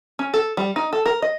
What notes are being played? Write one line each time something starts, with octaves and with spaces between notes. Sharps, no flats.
C#4
A4
G3
D#4
A4
A#4
D#5